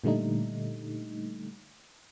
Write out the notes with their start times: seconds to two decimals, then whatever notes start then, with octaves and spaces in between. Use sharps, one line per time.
0.04 A#2 D3 G3 A3 D#4